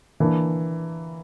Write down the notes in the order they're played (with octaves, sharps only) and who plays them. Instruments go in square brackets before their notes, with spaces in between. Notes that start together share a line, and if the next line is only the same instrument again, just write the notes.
[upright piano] E3 A#3 D4